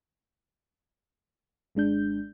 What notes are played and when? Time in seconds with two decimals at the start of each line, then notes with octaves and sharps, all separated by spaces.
1.75 G#1 G#3 D4 G6